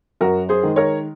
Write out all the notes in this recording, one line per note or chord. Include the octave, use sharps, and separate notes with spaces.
F#2 F#4 A#4
G#4 C5
D#3 G#3
A#4 C#5